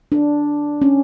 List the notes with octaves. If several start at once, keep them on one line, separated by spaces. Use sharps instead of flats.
D4
C#4